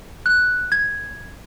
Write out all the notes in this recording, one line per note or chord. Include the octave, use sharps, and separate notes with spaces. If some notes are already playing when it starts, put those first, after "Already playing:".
F#6
G#6